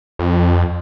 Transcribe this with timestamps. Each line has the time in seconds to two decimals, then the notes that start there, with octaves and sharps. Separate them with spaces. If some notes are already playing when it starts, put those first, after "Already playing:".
0.19 F2